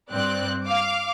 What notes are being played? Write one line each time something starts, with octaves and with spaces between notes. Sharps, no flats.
G2 C4 D5 F#6
F5 D6